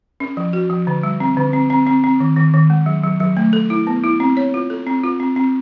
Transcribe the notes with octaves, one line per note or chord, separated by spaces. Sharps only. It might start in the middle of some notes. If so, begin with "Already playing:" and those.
C#4
F3
F#4
F3
D3
G3
C4
D3
C4
C4
C4
C4
D#3
D#3
D#3
G#3
F#3
F#3
F#3
A3
A4
E4
B3
E4
C4
C#5
F4
A4
C4
F4
C4
C4